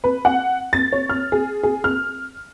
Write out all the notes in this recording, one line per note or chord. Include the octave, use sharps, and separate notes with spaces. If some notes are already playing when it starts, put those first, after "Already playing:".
B4
F#5
A6
C#5
F6
G#4
G#4
F6